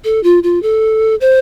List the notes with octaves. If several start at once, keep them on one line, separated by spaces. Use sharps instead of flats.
A4
F4
F4
A4
C5